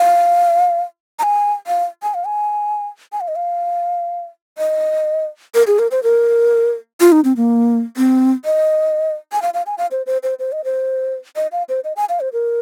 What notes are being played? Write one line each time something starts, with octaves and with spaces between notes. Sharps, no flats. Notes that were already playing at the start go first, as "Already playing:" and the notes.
Already playing: F5
A#5
G#5
F5
G#5
F5
G#5
G#5
F5
D#5
F5
D#5
A#4
G#4
A#4
C5
A#4
F4
D#4
C4
A#3
C4
D#5
G#5
F5
F5
G#5
F5
C5
C5
C5
C5
D#5
C5
D#5
F5
C5
D#5
G#5
F5
C5
A#4